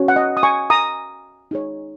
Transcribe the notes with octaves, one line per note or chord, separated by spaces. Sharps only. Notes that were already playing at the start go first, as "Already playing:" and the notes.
Already playing: C#4 F#4 C#5
F#5
D#5
D#6
G#5 C#6
A#5 D#6
D#4 G#4 C#5